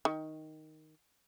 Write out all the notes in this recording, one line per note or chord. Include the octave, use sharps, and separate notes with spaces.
D#3